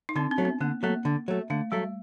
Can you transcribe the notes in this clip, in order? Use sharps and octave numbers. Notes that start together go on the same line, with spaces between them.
D#4
D3 C4 D4
C4
F#3 A3
B3
D3 A#3
F#3 A3 A#3
D3
F#3 A3
D3 A3
F#3 G3 A3